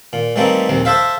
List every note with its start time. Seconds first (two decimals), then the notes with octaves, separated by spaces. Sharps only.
0.13 A#2
0.36 E3 G3 A3 A#3 C4 D#4
0.69 A#1 D#2 C4
0.85 A4 C5 E5 F5